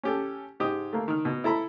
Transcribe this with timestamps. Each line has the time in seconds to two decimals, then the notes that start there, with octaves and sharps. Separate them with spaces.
0.03 C#4 G4 A4
0.60 G#2 G4 D#5 D#6
0.93 A3 A#3
1.08 D#3 F6
1.25 B2
1.44 E4 A4 A#5 B5